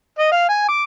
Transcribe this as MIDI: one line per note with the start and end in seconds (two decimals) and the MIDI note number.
0.19 0.30 75
0.32 0.46 77
0.49 0.68 80
0.68 0.83 86